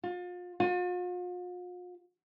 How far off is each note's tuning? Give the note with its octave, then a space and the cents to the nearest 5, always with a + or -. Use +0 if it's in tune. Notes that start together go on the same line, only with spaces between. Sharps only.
F4 +35
F4 +45